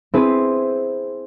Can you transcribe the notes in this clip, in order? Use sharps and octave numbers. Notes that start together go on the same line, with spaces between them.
C4 E4 G#4 B4 C5